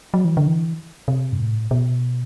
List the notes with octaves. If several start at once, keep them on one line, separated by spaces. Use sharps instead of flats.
F#3
E3
D3
E3
C3
G2
A2
B2